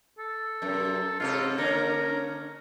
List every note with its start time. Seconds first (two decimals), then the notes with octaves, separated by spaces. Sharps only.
0.19 A4
0.62 F#2 C3
1.20 G#2 C3 F4 A4
1.58 D3 A#3 C#4 A#4